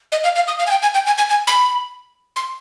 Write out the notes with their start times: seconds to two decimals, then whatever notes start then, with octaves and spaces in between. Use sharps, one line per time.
0.12 D#5
0.24 F5
0.36 F5
0.47 D#6
0.59 F5
0.67 G#5
0.71 G5
0.82 G#5
0.94 G5
1.06 G#5
1.18 G#5
1.29 G#5
1.47 B5
2.36 C6